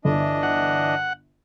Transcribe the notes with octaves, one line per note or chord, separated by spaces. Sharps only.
G1 E3 D4 D#5
F#5